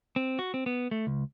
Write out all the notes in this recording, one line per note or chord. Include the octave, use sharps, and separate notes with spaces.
C4
F#4
C4
B3
A3
C#2